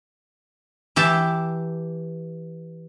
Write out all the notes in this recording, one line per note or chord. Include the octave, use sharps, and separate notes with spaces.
E3 G4 E5 A5